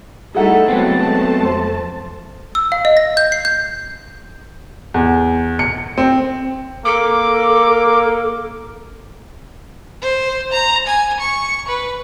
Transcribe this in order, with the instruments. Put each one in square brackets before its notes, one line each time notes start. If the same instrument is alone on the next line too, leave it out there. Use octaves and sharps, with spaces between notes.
[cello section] G3 A3 E4 [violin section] D#4 A4 [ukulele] G#4 F#5
[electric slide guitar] F#3 B3 C4 [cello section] G#3 [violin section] A3 A5
[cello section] F2 [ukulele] C5
[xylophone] E6
F5
D#5
A#6
G6
C7
G6
[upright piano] E2
C#7
C4
[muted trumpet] A#3 [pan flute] A4 [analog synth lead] D6
[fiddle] C5
A#5
G#5
C#6
B4